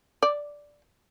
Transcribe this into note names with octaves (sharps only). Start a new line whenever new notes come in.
D5